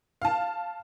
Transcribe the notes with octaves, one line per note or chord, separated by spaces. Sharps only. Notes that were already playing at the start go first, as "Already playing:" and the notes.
F5 A5